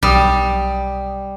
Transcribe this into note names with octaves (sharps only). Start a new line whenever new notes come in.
B1 G3 D#6